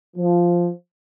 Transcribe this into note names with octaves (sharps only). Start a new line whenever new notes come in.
F3